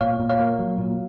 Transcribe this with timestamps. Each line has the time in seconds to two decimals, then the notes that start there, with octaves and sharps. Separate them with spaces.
0.01 A#2 C#5 F5
0.20 A#2
0.29 C#5 F5
0.39 A#3
0.59 F#3
0.78 A#2